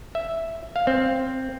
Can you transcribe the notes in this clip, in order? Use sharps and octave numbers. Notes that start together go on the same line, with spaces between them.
E5
F5
C4